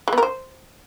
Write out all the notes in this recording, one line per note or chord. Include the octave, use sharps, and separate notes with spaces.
G#3
B3
A#4
C5